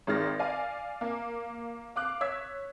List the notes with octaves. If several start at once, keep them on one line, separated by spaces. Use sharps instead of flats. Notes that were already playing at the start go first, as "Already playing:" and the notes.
G#1 D#3 G#3 F6 A6 A#6
D5 F5 G#5
A#3
F5 D6 F#6
C#5 E6 G#6 B6